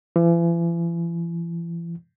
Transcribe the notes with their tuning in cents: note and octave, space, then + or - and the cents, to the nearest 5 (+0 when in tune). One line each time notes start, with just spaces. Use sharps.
E3 +40